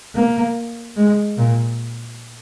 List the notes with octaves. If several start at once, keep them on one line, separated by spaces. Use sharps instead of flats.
A#3
G#3
A#2